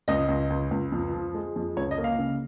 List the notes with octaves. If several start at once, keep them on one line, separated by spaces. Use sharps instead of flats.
C#2 D#5
C#2
C#2
C#2
F2
F3
G#3
F2
C#2 C#5
D#5
A#3
F5
C#3